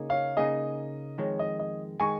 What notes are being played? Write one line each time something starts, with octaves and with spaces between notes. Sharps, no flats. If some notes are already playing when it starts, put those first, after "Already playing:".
Already playing: C#3 A#3 D#4 G#4
C#5 F5
C#3 A#3 D#4 G#4 D#5
F2 D#3 G#3 C#5
D#5
D#5
D#3 G#3 G#5 C#6